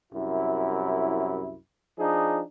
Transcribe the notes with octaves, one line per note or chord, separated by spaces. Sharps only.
C2 F#2 E4
F3 D4 D#4 G#4